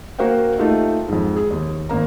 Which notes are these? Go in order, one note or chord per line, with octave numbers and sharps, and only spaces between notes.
A#3 F#4 A#4 C5 F5 G5
A3 D#4 F4 G4 E5
F2 G#2
G#4
D#2
G#1 A#3 A#5